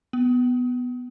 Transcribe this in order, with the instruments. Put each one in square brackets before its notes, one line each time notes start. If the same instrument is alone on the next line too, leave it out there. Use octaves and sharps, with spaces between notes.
[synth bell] B3